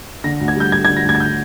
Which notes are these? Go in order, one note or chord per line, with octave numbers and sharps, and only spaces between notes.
D3 A#6
D2
G#6
G3 G6
D2 G#6
D3 G#6
A#6
D2 G#6
G#6
G6